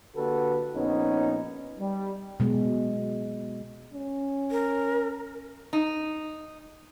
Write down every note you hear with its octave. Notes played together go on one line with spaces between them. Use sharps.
D3 A#3 F#4 G4 A4 B4
A#1 B3 C#4 D#4
G3
B2 G#3
C#4
A#4
D#4